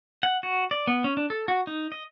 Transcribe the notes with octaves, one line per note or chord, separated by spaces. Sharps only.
F#5
F#4
D5
B3
C#4
D4
A4
F#4
D#4
D#5